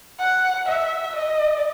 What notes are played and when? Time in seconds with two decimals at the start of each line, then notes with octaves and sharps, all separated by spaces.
0.19 F#5
0.68 E5
1.16 D#5